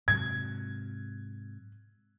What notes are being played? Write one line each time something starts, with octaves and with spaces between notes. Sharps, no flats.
G#2 C3 F#3 G#6